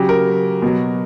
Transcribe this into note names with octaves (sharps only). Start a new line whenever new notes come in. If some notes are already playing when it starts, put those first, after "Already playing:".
Already playing: C#3 F#3 G4
A#4
B2 F#3